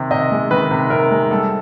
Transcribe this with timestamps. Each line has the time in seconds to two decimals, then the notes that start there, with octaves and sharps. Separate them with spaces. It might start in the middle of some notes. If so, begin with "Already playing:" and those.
Already playing: C3 D#3
0.11 C3 D#5
0.31 G#3
0.51 D#3 B4
0.71 C3
0.90 C3 A#4
1.11 G#3
1.31 G3 A4